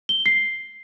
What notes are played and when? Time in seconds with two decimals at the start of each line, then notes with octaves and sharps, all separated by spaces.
0.09 G7
0.26 C7